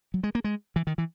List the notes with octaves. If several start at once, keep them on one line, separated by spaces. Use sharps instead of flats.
F#3
G#3
A#3
G#3
E3
D#3
E3